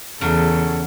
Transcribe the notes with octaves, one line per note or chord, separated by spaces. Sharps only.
E2 C#3 F#3 G#4 A4